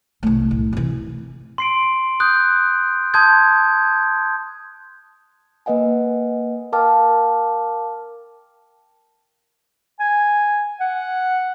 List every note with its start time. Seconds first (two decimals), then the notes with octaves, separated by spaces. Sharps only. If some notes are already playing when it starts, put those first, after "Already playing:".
0.23 C2 A3
0.51 A2
0.73 C3 E3
1.58 C6 C7 D7
2.20 D#6 F#6 G6
3.14 A5 C6 D#6 G6 G#6
5.66 A#3 B4 D#5 F#5 G#5
6.73 A#4 F5 G5 A5 D6 F6
10.00 G#5
10.80 F#5